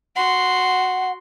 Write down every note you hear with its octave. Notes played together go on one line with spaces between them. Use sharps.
F#4 F#5 C6